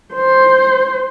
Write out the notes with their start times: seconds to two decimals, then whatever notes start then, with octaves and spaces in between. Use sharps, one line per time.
0.14 C5